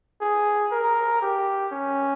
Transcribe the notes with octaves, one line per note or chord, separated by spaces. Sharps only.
G#4
A#4
G4
C#4